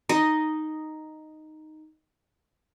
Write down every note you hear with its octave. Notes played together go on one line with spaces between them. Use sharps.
D#4 D#5